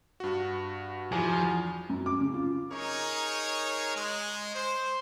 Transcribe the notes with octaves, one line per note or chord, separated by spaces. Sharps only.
G2 F#4
E2 F3 G#5
F#2
D6
C#3
F4
D#4 G#4 A#4 C#5
G#3
C5